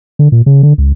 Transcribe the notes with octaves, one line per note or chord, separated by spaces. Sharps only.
D3
A#2
C#3
D3
C#2